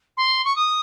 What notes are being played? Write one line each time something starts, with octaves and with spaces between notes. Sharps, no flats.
C6
C#6
D#6